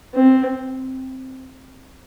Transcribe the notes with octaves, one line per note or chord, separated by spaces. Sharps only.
C4